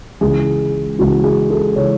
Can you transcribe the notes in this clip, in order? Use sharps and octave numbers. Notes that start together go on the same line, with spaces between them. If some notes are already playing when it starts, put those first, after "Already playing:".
C#2 C#3 E3 G#4
C#2 C#3 E3 F#4
G#4
A4
C#3 E3 C#5